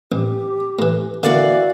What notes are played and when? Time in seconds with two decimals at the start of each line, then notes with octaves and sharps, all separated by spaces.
0.12 A1 G4
0.79 A2 E3
1.23 D3 E3 A#3 F#4 D5 F5